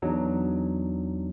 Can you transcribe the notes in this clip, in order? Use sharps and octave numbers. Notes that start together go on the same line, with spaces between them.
E2 F#3 D4 D#4